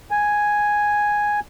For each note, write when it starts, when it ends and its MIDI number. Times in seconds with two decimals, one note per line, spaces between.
0.11 1.40 80